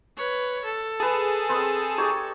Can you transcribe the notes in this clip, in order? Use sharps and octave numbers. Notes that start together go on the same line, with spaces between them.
B4 C#5
A4
G#4 B4 A5 A#5
C4 B4 D#5
D#4 G4 C#5